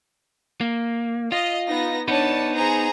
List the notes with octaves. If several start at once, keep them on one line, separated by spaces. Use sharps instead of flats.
A#3
F4 D#5
B3 D#4 A#6
B3 D4 D#4 B4 C#5 A5
G#4 C5 A#5